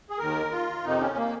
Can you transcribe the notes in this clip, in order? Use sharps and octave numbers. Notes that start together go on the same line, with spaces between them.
G#4
D#2 D#3 A#4
F4
F2 C3 D#3 D#4
C#4
A#3